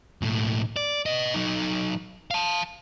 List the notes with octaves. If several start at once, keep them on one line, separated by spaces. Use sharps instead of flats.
B1 A2
D5
B4 D#5
F#3 D#4
F5 A5